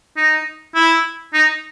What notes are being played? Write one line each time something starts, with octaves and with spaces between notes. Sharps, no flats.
D#4
E4
D#4